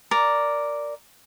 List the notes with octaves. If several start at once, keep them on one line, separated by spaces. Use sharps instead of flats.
A#4 D5